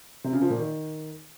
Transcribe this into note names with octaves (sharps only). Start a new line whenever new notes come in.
C3
C#3
F3
A#2
D#3